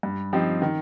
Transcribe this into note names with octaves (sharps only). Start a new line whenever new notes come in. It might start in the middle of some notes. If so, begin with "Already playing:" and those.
G2
F3 C4 D#4 G4
D#3